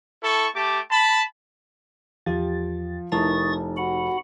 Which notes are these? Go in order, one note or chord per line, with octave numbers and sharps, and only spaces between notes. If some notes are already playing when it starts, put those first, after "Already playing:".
E4 A4 A5 C#6
A3 G4 A5 D6
A5 B5
E2 F3 G4 A6
F1 D#4 E4 A#4 A5 C#6 D#6 A6
F#4 F#5 B5